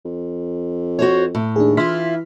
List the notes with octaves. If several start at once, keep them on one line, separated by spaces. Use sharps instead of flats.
F2
F#4 C5 C#5
A2
D#2 D4 G#4
E3 E4 F4 C6 F6 B6